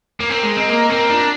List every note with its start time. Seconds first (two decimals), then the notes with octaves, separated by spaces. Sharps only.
0.20 A#3
0.29 C4 A#4
0.43 G#3
0.49 D#5
0.56 C4
0.69 A#3 A#4
0.90 C4 A#4
1.09 D4 F4